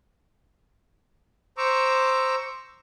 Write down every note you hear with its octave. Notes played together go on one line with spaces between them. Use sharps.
C5 A#5 C#6 D6 E6